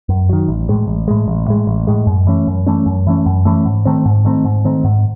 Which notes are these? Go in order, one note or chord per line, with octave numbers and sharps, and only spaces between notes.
F#2
D#3 F#3
A1
A2 G#3
A1
A2 G#3
A1
A2 G#3
A1
A2 G#3
F#2
E3 A3 C#4
F#2
E3 A3 C#4
F#2
E3 A3 C#4
F#2
E3 A3 C#4
G#2
D#3 A3 C4
G#2
D#3 A3 C4
G#2
D#3 A3 C4
G#2